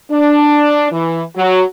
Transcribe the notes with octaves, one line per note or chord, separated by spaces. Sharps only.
D4
E3
F#3